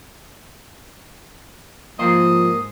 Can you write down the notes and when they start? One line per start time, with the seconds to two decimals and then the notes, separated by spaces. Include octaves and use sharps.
1.99 G#2 B2 F3 A#3 G4 A#4 C5 D#5